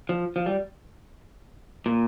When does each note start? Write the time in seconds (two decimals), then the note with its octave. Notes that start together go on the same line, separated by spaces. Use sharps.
0.09 F3
0.36 F3
0.46 G3
1.86 A#2